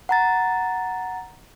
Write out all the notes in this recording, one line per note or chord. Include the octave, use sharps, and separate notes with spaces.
F#5 A#5 A6